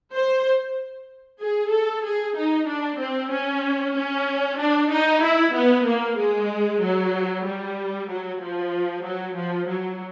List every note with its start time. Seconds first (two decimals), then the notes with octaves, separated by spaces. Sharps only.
0.13 C5
1.40 G#4
1.71 A4
2.03 G#4
2.36 D#4
2.68 D4
2.99 C4
3.31 C#4
3.95 C#4
4.58 D4
4.90 D#4
5.23 E4
5.54 B3
5.85 A#3
6.17 G#3
6.81 F#3
7.45 G3
8.09 F#3
8.41 F3
9.04 F#3
9.35 F3
9.68 F#3